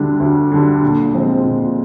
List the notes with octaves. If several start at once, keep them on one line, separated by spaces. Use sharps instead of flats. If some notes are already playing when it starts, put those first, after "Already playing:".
Already playing: D2 D3 G3 D4
D2
D3 G3 D4
A#2
F3 G#3 C4
A#2